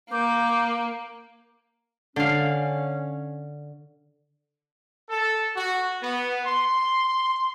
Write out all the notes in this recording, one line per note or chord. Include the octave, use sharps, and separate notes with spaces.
A#3 D6 G6
D3 C#4 F5
A4
F#4
B3
C6